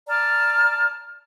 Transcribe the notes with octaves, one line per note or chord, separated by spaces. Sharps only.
D5 A5 A#5 F6